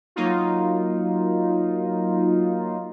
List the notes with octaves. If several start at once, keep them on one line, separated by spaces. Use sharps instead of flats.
F#3 A#3 D#4 F4